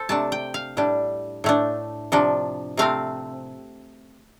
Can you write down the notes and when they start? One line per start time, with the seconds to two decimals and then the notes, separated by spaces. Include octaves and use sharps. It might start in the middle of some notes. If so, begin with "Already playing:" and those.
Already playing: A4 C5
0.09 C3 A3 D4 A5
0.32 G5
0.54 F5
0.77 A2 G3 D4
1.44 A2 A3 D4
2.12 C3 F3 D4
2.77 C3 A3 C4 F5